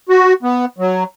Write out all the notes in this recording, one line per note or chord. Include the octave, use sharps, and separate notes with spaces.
F#4
B3
F#3